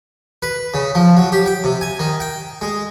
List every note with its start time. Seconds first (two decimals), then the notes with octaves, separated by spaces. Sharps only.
0.42 B4
0.74 C#3
0.95 F3
1.17 F#3
1.32 G4
1.46 G5
1.64 C3
1.81 G#5
1.99 D#3
2.20 G5
2.61 G#3